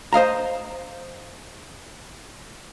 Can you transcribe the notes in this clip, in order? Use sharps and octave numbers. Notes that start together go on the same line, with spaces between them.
C5 D#5 F5 A#5